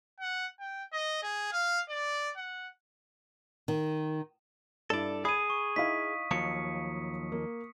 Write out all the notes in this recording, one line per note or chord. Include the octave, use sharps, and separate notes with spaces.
F#5
G5
D#5
G#4
F5
D5
F#5
D#3
G2 E4 A4 D5
G#4 B5 D#6 G#6 D#7
C#6
D#4 E4 F5 B6
D#2 F3 F#3 C#7
A#3